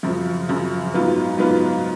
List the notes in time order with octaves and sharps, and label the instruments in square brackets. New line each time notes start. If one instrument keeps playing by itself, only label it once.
[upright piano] F#2 C#3 F3
F#2 C#3 F3
G#2 F#3 B3 F4
G#2 F#3 B3 F4